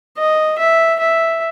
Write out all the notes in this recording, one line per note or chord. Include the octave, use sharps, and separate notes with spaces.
D#5
E5
E5